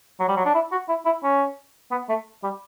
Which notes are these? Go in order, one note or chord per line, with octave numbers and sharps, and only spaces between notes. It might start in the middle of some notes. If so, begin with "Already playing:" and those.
F#3
G3
F#3
D4
E4
F#4
E4
E4
C#4
B3
A3
G3